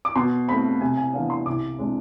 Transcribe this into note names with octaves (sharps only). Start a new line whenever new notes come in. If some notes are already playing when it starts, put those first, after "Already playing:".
D6
B2 C6
A3 C4 B5
C3 G#5
G#5
E3 B3 D4 F5
C6
C2 D6
C3 G#3 D4